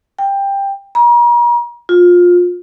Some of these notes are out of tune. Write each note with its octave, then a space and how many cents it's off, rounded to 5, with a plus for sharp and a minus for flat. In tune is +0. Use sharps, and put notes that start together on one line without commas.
G5 +15
A#5 +40
F4 +20